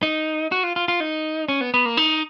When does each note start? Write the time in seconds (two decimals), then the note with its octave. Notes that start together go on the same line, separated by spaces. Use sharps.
0.03 D#4
0.52 F#4
0.64 F4
0.76 F4
0.88 F4
1.00 D#4
1.48 C#4
1.61 B3
1.74 B3
1.86 A#3
1.97 D#4